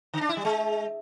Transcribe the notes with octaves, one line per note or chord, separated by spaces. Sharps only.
D3
D4
E4
G3
G#3